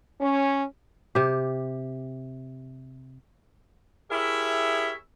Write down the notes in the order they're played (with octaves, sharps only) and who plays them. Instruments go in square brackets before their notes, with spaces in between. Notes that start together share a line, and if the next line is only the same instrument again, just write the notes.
[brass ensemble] C#4
[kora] C3 G4
[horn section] E4 G4 G#4 A#4 C#5 E5